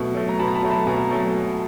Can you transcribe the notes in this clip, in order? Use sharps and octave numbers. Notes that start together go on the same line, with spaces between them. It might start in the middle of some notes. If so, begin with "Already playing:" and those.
Already playing: B2 F#3 A3
F#3 A3
A#5
B2 A5 B5
A#5
A5 B5
F#3 A3
A5 B5
B2 G#5 A#5
F#3 A3